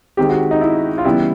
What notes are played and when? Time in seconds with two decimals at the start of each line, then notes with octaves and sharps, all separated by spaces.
0.17 D#3 G#3 C4 G4
0.29 F#4
0.51 D#4
0.61 E4
0.98 F4
1.05 C#3 E3 G3 B3 E4